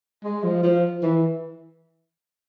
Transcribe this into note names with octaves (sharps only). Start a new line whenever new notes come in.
G#3
F3
F3
E3